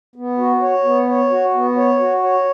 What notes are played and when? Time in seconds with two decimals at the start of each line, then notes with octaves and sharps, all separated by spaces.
0.16 B3
0.38 F#4
0.62 C#5
0.84 B3
1.08 C#5
1.30 F#4
1.54 B3
1.77 C#5
2.00 F#4
2.23 C#5